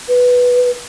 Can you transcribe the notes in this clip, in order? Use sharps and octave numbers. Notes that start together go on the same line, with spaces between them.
B4